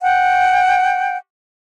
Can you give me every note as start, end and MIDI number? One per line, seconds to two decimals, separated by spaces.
0.01 1.16 78
0.01 1.16 79